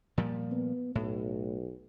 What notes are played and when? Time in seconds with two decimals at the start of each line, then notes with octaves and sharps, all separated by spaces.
0.18 A#2 F3 G3
0.52 B3
0.95 B1 A2